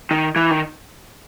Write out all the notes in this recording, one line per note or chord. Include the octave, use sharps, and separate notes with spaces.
D#3
E3
D#3